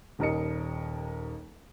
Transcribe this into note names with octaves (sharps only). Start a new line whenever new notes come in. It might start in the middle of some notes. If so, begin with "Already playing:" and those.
D#1 D#2 A#4 D#5 C#7